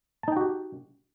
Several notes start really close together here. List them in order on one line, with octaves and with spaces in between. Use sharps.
A5 D#4 G5 F#4 G4